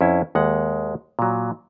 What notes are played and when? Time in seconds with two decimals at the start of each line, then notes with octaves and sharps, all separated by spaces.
0.01 F2 C#4 E4
0.35 D#2 G#3 F#5
1.19 A#2 F#3